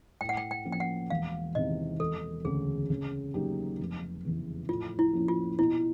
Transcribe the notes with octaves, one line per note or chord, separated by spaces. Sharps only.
A2 G5
F#5
G5
G5
F3 A#3 C#4
G5
F#5
E1 F5
E2 C3 D#3 D#5
E1 A4
D2 C#3 G#4
C#3
F#3 A#3 D#4 G4
F1
E2 C#3 E3
A2 F4
E4
F3 A#3 C#4
F4
B2 E4